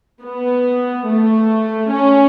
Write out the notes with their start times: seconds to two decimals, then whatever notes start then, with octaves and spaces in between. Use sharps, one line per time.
0.22 B3
1.06 A3
1.91 C#4